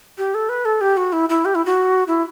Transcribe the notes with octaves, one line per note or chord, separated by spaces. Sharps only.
G4
A4
B4
A4
G4
F#4
E4
E4
G4
E4
F#4
E4